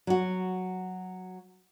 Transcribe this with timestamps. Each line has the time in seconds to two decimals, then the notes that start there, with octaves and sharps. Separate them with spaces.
0.07 F#3 F#4